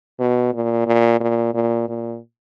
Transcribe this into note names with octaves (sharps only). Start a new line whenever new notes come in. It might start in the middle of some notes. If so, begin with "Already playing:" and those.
B2
A#2
A#2
A#2
A#2
A#2